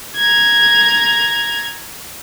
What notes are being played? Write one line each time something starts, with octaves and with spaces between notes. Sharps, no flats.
A#5 G#6